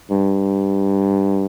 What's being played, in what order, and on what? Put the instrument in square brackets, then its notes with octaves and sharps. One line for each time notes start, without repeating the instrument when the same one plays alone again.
[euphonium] G2